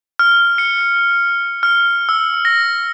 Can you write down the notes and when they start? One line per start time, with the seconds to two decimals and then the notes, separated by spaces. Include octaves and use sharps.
0.19 F6
0.58 C#7
1.63 F6
2.09 E6
2.45 A#6